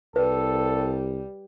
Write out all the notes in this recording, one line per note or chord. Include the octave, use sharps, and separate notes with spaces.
C2 G3 A4 B4